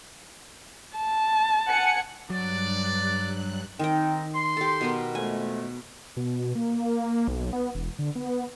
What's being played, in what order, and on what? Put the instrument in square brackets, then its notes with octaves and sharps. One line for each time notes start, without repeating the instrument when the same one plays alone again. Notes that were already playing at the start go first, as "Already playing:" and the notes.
[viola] A5
[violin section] F#5 G#5 C#7
[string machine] G2 F#6 [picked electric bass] F#3 [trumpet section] D5
[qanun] D#3 G5 [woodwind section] C4 D#4
[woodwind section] C6
[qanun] G4 A4
B2 B3 A#4
[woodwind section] F2 G#3 A3 [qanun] G#5
[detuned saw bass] B2
A#3
B1
B3
E1
D3
B3